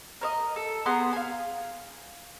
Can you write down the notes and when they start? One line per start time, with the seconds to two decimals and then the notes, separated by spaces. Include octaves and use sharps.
0.21 A#4 C#5 D#5
0.56 A4
0.86 B3 G#4 A#5 C6
1.13 F5 G#5